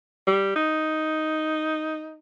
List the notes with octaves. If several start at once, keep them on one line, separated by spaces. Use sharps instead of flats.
G3
D#4